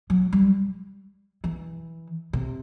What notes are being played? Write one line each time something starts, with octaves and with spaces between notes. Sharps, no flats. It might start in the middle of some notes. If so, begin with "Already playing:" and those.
F#3
G3
E3
C3